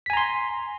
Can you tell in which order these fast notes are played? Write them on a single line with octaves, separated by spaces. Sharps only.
B6 G#5 A#5 C6